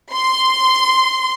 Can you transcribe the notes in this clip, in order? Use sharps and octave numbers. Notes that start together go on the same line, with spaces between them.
C6